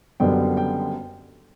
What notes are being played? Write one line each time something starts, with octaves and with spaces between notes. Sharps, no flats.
F#1 F#2 D3 G3 B3 G5
G5